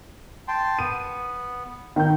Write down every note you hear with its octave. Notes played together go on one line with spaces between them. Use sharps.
G5 A5 C6
B3 D#7
D#3 G6